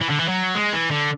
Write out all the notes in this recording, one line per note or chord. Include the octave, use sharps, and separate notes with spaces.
E3
D3
E3
F#3
G#3
E3
D3